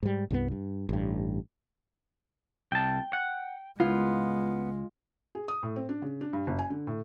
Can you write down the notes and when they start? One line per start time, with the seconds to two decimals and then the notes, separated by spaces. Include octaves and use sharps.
0.03 G#2 G3
0.31 C2 G2 G#3 B3
0.52 G2
0.89 A1 G2
2.72 C2 G5 A5
3.13 F#5
3.80 C#2 G#3 B3 F4
5.35 G#4
5.48 D#6
5.63 A2
5.76 C4
5.89 D4
6.02 C#3
6.21 D4
6.33 G2
6.47 F#1
6.59 G#5
6.70 D3
6.87 A2